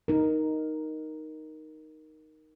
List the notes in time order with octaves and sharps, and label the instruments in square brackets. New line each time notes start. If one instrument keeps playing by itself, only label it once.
[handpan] D#4 A#4